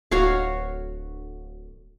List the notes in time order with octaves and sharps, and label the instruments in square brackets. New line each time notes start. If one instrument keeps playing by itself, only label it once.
[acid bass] D1 [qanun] F#4 C#5 F5